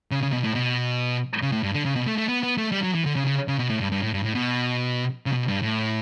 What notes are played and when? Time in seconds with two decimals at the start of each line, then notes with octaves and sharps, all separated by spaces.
0.11 C#3
0.22 C#3
0.33 B2
0.44 A2
0.55 B2
1.42 C#3
1.52 A2
1.63 G2
1.74 D3
1.85 C#3
1.96 B2
2.07 A3
2.18 A3
2.28 B3
2.43 B3
2.58 A3
2.72 G3
2.83 F#3
2.94 E3
3.05 D3
3.16 C#3
3.27 C#3
3.48 C#3
3.59 B2
3.70 A2
3.80 G2
3.92 G2
4.02 A2
4.14 G2
4.25 A2
4.35 B2
5.26 C#3
5.33 B2
5.48 G2
5.62 A2